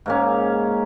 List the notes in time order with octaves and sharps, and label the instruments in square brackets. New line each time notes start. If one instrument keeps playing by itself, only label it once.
[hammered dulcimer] G#2 A#3 C#4